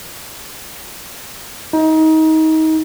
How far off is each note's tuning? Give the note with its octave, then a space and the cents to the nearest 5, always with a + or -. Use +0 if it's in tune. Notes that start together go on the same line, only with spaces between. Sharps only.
D#4 +25